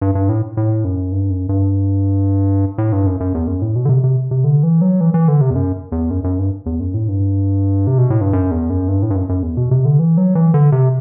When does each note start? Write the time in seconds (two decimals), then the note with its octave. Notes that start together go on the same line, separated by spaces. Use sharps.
0.02 G2
0.15 G2
0.29 A2
0.57 A2
0.84 F#2
1.12 G2
1.30 F#2
1.49 G2
2.78 A2
2.92 G2
3.06 F#2
3.20 F#2
3.34 E2
3.47 F#2
3.62 A2
3.76 B2
3.85 D3
3.89 C3
4.04 C3
4.31 C3
4.44 D3
4.63 E3
4.81 F#3
5.01 E3
5.14 E3
5.28 D3
5.41 C3
5.50 E2
5.55 F#2
5.92 E2
6.10 F#2
6.24 F#2
6.38 G2
6.66 E2
6.80 F#2
6.94 A2
7.08 G2
7.87 C3
7.98 B2
8.10 A2
8.21 G2
8.33 F#2
8.51 E2
8.70 F#2
8.88 G2
9.02 A2
9.11 G2
9.16 F#2
9.29 F#2
9.43 E2
9.57 B2
9.71 C3
9.85 D3
9.99 E3
10.17 F#3
10.35 E3
10.54 D3
10.72 C3